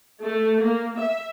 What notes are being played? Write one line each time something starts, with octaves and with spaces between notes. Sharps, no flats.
A3
A#3
E5